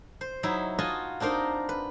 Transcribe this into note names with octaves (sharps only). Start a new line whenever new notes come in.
C5
F#3 D#4 E4 E5
F4 F#4 D#5 G#5 A5
C4 D4 D#4 A#4 C5
B4